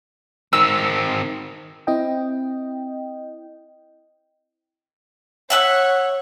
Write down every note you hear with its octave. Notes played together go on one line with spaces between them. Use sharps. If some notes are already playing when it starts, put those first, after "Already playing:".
D#3 C4 E6
C4 E4 D#5 G5
C#5 E5 F#5 E6